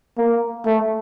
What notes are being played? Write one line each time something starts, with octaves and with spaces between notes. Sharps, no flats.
A#3
A3